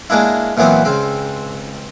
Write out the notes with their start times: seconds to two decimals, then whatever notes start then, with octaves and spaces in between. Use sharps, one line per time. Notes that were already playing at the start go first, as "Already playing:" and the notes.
0.10 G#3 A#3 D4 E4
0.57 A#2 E3 F#3 B3 C4
0.85 C#2 C4